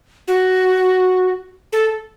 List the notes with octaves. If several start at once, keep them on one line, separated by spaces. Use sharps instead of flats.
F#4
A4